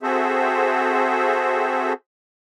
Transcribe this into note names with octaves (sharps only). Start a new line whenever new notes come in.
C4 F#4 G#4 A4 C5 E5